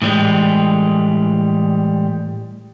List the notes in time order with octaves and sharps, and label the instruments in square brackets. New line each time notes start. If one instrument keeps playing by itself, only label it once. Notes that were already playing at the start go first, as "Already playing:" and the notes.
[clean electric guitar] A2 E3 F3 G3 G#3